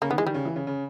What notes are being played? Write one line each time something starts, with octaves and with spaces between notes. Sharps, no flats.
C#3 A#3
D#3 B3
E3 G#3
D#3 G3
C#3
E3
C#3
C#3